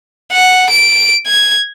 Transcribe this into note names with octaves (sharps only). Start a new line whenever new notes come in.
F#5
D7
G#6